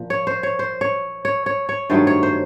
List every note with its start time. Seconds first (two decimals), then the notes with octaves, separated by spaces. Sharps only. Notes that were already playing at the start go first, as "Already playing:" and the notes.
Already playing: A#2 F3
0.10 C#5
0.27 C5
0.43 C#5
0.59 C5
0.81 C#5
1.25 C#5
1.46 C#5
1.69 C#5
1.90 G2 D#3 F#3 A3 C5
2.07 C#5
2.23 C5